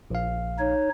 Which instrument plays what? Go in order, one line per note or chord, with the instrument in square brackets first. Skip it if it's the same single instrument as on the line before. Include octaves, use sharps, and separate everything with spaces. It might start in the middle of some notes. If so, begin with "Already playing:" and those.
[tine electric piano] A#1 F5
[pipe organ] D#4 C#5